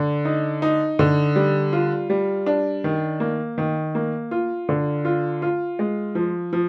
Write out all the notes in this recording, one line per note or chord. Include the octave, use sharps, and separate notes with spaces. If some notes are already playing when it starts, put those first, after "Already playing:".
Already playing: D3
D#4
D#4
D3
G3
F4
G3
D4
D#3
A#3
D#3
A#3
F4
D3
F4
F4
G#3
F3
F3